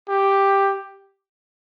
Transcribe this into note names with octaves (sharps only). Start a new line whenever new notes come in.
G4